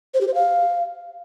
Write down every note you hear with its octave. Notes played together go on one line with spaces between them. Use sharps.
C5
G4
C5
F5